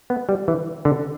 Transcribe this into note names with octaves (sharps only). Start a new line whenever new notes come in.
B3
G3
E3
D3